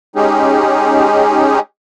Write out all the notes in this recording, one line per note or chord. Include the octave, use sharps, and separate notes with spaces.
G#3 C#4 D#4 G4 G#4